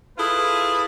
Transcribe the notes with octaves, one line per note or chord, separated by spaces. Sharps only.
E4 F4 G#4 A4 B4